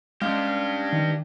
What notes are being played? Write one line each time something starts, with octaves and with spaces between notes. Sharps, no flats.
G#3 C#4 D4 G4 F5 F6
D#3